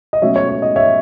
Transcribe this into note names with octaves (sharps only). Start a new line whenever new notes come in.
D#5
B2 F#3 A3 C#4 C#5 E5
C#5
C#5
D#5
C#5 E5